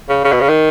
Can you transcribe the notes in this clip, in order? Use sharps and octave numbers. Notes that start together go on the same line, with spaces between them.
C#3
C#3
B2
C#3
D#3